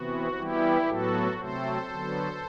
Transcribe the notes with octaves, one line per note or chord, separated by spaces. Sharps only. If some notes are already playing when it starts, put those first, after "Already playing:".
Already playing: C3 E3 B3 F#4
E3 G3 B3 E4 G4
A2 F#3 B3 F#4 A4
C3 F#3 A3 C4 A4 C5
D3 F#3 B3